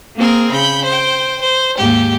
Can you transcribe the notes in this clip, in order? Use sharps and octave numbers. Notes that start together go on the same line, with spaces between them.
A#3 C4 G#4 A#4
C#3 B5 G6
C5 G5
C5
D#2 G#2 G4